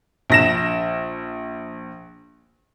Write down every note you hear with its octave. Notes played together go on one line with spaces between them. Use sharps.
A#1 A#6 E7